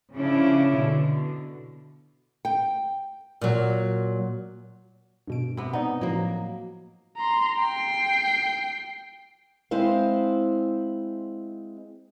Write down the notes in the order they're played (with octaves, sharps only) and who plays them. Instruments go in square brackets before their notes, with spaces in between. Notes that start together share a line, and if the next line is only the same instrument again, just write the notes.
[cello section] C#3 F3 C#4 D4 E4
B2 D3
[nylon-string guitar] G5
A#2 F#3
[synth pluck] G2 B2 D7
[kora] C3 B3
[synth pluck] B3 D5 [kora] D#4
[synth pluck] A2 F3 [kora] F#3 A#3
[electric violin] A#5 C6
G5 C7
[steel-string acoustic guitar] G#3 C4 E4 C5 F5